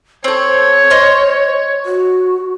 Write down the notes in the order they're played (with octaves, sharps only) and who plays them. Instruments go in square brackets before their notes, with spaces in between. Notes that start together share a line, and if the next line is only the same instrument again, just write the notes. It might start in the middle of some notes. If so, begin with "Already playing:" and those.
[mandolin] C4 A4 [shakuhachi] C5 [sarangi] C#5
[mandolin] D#5 C6 F6
[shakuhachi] F#4